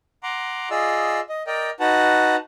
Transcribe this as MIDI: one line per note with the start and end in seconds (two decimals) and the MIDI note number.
0.23 0.69 78
0.23 0.69 82
0.23 0.69 84
0.23 0.69 86
0.71 1.20 65
0.71 1.20 68
0.71 1.20 74
0.71 1.20 75
0.71 1.20 88
1.29 1.42 75
1.47 1.70 70
1.47 1.70 74
1.47 1.70 75
1.47 1.70 79
1.80 2.36 63
1.80 2.36 66
1.80 2.36 71
1.80 2.36 78
1.80 2.36 81